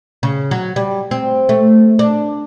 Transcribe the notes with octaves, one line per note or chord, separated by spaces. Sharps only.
C#3
F#3
G3
C4
A3
D4